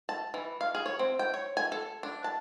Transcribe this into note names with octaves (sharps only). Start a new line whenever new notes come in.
A5
E3
F5
G#4
C#5
C4
G5
C#5
G#5
A4
D4
A5